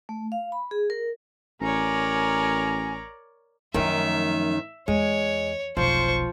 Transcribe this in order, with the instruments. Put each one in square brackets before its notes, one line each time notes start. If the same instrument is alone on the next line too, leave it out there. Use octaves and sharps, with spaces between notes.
[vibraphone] A3
F5
B5
G#4
A#4
[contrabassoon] A1 [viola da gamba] A#4 C#5 D5 [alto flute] G#5 [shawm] A#5
[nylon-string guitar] F#2 D#3 [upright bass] F3 A3 [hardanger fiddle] E5
[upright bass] E2 [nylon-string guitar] G#3 [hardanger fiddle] C#5
[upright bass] F1 B1 [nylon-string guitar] F3 [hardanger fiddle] C5 C#6